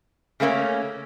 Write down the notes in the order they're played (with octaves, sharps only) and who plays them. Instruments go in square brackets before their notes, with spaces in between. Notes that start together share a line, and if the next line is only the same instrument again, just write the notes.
[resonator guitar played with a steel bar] C#3 A3 A#3 C4 C#4